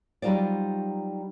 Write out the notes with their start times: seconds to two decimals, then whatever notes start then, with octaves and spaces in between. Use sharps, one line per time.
0.22 F#3 G3 D#4 F4 C5 D5